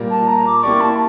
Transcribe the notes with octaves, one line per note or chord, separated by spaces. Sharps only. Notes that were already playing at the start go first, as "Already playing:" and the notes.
Already playing: A#2 G3 A#3
A5
A#5
D6
A#3 E4 G4 D5 C#6
A5